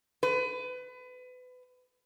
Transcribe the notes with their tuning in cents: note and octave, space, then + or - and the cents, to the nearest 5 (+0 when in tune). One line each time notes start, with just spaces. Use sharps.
B4 +30